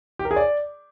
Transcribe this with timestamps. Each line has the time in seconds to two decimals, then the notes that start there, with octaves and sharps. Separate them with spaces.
0.19 G4
0.25 A#4
0.31 G#4
0.36 D5